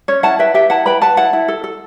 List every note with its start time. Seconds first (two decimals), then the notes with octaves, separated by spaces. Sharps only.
0.08 C#4 C#5
0.23 E4 F#5 A5
0.39 B4 E5 G5
0.54 G4 E5 G5
0.70 E4 F#5 A5
0.86 B4 G5 B5
1.02 B4 F#5 A5
1.17 E4 F#5 A5
1.33 E4
1.48 A4
1.64 A4